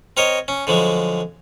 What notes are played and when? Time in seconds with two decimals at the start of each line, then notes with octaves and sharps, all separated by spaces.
0.17 C4 A#4 C#5 D#5
0.48 C#4
0.67 D3 F3 F#3 G#3